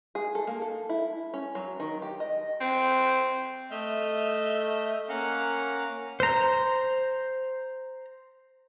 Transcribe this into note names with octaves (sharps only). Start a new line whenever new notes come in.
G#4
A4
A#3
A4
E4
C#4
F#3
D#3
G4
D#5
C4
A3 D#5 E5 F6 G6
A#3 C#4 F5 F#5 A#5
C5 A#5